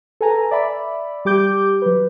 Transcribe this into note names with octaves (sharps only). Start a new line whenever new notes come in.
A4 B4 G#5 A#5
D5 E5 B5
G3 G4 D6 G6
F#3 B4